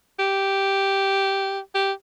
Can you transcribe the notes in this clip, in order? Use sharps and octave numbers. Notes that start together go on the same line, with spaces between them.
G4
G4